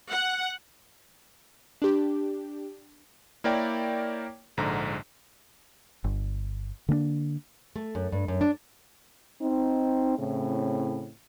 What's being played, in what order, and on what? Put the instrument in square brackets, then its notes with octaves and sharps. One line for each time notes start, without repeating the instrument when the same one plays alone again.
[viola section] F#5
[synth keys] D4 G4
[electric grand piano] A#3 E4 A#4 C#5 D5 G5
A#1 G#2 D3 A#5
[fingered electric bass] G1
D3 A#3 B3 D4
[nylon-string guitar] A3
F#2
G2
F#2
D4
[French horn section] C4 D#4
A2 C#3 C4 E4